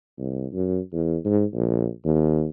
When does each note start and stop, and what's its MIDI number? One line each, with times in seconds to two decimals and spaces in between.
0.18 0.47 36
0.53 0.79 42
0.93 1.17 40
1.25 1.44 44
1.53 1.88 34
2.05 2.48 39